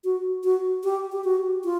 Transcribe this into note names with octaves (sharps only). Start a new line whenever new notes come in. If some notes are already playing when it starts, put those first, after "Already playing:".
F#4
F#4
G4
G4
F#4
F4